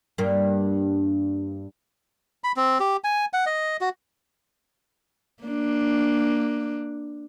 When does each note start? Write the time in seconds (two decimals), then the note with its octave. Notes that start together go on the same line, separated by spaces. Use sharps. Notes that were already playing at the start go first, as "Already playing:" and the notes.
0.18 G2 A#3
2.44 B5
2.56 C4
2.80 G4
3.04 G#5
3.33 F#5
3.46 D#5
3.81 F#4
5.43 A#3 D4